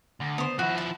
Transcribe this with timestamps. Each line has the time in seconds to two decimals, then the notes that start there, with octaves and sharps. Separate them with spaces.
0.20 D2
0.38 B3 C5
0.59 F3 E4 F#4
0.78 A5